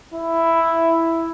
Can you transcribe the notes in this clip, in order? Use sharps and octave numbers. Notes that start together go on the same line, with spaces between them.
E4